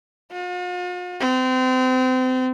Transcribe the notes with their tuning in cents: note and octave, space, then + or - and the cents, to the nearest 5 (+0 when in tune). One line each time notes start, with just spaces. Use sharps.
F4 +45
C4 -30